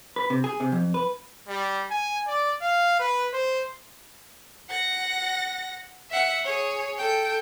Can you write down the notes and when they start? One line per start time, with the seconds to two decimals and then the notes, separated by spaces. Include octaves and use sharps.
0.16 B4
0.30 C3
0.44 G#4
0.60 C3
0.72 F2
0.94 B4
1.48 G3
1.91 G#5
2.28 D5
2.62 F5
3.00 B4
3.33 C5
4.70 F#5 A#6
6.10 E5 F#5
6.44 G#4 C#5
6.97 A4 G5